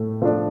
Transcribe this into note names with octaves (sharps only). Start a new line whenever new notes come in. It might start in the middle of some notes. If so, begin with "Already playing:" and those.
Already playing: A2 A3
F3 A3 D4